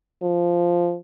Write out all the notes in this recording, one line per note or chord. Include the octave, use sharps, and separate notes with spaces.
F3